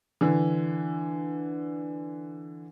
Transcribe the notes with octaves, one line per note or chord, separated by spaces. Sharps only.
D3 E3